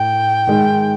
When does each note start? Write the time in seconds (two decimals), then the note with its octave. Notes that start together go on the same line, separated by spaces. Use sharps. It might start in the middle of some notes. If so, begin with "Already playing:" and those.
Already playing: A2 G5
0.47 G#2 D#3 G#3